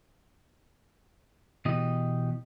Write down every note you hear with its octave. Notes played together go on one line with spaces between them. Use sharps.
B2 E3 G4 D#5